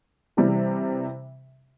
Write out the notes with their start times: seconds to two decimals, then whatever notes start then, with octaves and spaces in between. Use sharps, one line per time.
0.37 C3 E3 G3